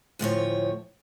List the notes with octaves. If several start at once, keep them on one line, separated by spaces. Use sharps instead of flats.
D2 A2 F3 C#5